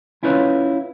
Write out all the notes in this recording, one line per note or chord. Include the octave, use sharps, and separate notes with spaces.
C#4 E4 F4 B4 C#5 F5